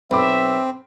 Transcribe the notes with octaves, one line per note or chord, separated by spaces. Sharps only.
B1 C4 E5 B5 D6